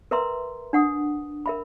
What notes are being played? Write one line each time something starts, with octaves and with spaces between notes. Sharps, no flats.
A#4 B4 E5 A#5 C6
D4 F#5 D#6
A#4 E5 B5